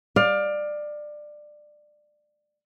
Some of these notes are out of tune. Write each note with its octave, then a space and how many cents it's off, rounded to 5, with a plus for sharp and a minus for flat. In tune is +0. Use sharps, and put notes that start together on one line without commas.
D5 +20 F5 +20